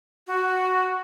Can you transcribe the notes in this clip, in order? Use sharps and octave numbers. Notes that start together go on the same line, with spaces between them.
F#4